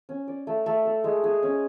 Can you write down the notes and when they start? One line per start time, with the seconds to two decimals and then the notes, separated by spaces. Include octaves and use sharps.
0.09 C#4
0.28 D5
0.47 A3
0.66 A3
0.85 A4
1.04 G#3
1.24 G#4
1.43 C#4